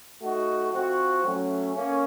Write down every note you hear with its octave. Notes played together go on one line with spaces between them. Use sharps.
A3 D#4 F#4
F3 C4 F#4
F#3 A3 C#4
A#3 C#4